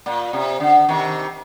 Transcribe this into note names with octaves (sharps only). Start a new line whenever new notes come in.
A#2
C3
D3
C3 D#3